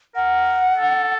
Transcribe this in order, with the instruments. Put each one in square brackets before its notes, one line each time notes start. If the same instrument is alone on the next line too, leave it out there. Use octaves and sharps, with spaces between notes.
[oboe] A#4 [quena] F#5
[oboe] A4